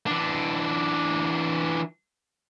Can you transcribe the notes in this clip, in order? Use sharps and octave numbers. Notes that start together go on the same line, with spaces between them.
E3 D4